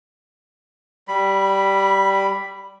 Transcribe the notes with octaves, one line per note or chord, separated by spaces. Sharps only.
G3 B5